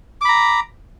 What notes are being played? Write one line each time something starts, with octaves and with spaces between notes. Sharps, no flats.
A#5 B5 D6